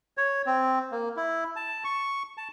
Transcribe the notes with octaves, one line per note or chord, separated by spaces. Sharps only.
C#5
C4
A#3
E4
A5
C#6
A5